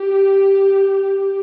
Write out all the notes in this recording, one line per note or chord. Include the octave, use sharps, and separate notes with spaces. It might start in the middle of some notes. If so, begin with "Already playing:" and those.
Already playing: G4